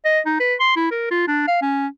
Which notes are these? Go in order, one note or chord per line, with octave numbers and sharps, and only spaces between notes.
D#5
D#4
B4
C6
E4
A#4
F4
D4
F5
C#4